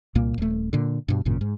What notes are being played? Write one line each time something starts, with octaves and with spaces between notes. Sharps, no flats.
C2 A#2 A#3
D#1 A3
A#2 D3
G2 B2
G#1 F#2 A#2 C#3
G#2